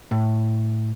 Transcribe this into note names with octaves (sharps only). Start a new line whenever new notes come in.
A2